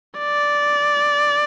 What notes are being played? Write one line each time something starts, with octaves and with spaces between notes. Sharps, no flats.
D5